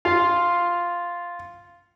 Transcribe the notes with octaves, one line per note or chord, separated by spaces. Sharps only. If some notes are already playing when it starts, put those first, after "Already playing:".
F4 F5